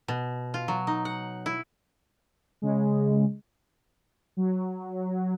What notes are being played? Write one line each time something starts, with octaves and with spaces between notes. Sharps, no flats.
B2
F4
F#3
D#4
F#5
E4
C#3 G#3
F#3